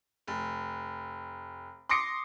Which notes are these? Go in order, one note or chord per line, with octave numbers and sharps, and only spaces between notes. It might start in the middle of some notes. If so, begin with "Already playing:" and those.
F1
C6 D6 D#6 A#6 C7 C#7